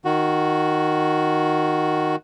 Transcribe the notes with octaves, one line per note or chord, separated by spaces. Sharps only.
D#3 F#4